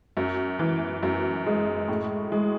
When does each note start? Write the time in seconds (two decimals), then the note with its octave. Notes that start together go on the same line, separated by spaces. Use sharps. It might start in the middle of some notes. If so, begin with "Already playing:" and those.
0.17 F#2
0.59 E3
1.03 F#2
1.46 G#3
1.88 A2
2.32 G#3